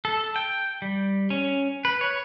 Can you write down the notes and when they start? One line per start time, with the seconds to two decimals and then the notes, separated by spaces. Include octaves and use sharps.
0.05 A4
0.36 G5
0.82 G3
1.30 C#4
1.85 B4
2.01 C#5